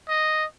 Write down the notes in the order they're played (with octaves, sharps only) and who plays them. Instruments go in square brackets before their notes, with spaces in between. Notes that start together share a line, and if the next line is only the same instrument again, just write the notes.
[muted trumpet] D#5